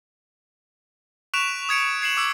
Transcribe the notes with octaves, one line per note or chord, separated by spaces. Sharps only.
C#6 F#6 B6 D7 E7 F7
D#6 G#6 C#7 D7
G#6 C7 E7 F#7
D6 E6 C#7 F#7